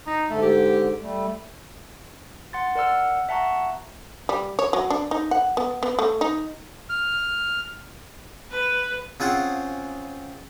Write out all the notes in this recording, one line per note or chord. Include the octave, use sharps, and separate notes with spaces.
D#4
G#2 D3 A3
G4
G3 A3
F#5 C6 A6
A#4 D5 F#5 E6 F6
E5 F#5 A5 A#5 C#6
G3
C#5
F#3
D4
D#4
F#5
B3
B3
A3
D#4
F6
B4
C#3 C4 F4 G#4 C5 F#5